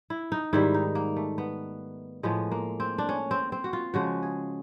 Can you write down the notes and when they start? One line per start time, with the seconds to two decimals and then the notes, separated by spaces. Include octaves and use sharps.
0.10 E4
0.32 D#4
0.53 G#2 D#3 G3 E4
0.74 D#4
0.95 A#3
1.16 A3
1.38 B3
2.23 A2 F3 G#3 B3
2.51 A#3
2.80 C4
2.98 D4
3.09 C#4
3.31 C4
3.52 C4
3.64 F#4
3.73 F4
3.94 C#3 F3 G#3 F#4
4.23 G#4